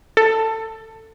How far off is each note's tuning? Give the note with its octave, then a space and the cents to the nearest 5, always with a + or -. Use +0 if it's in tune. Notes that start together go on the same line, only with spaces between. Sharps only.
A4 +20